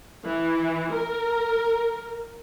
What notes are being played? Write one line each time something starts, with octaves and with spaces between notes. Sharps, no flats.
E3
A#4